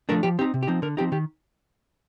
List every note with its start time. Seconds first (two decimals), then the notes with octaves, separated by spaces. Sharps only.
0.09 F3 A3 D4 A#4
0.23 F3 G4
0.39 C4 D#4 G4
0.54 C3
0.63 G4
0.67 F3 C4 D#4
0.82 D3 A#4
0.97 F3 C4 D#4 G4
1.12 D#3 G4